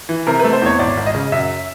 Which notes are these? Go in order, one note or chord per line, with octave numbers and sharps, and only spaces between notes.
E3
C3 A#4
A3 B4
C5
E2 C#5
G#1 D5
G#1
D#5
C#3
F#2 E5